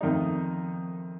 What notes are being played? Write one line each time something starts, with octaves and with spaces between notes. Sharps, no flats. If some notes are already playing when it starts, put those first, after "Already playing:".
F2 D#3 A3 D#4